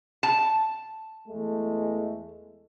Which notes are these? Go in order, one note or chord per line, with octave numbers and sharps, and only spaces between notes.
A5
E2 G#3 A3